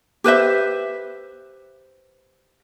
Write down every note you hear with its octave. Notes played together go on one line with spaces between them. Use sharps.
G4 B4 C5 E5